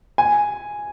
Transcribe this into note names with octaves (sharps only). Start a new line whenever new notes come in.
G#5